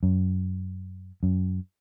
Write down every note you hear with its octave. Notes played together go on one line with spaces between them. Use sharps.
F#2
F#2